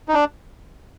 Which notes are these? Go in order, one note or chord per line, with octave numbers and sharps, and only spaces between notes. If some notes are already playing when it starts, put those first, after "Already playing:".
D#4
D4